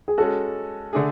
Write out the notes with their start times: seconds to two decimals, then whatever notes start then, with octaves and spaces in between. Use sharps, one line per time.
0.08 G#4
0.18 G#3 C#4 F#4 A4
0.93 D3 A3 D4 G#4